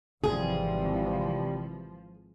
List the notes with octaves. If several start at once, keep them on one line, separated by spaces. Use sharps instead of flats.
G#1 C3 E3 F3 G3 G#4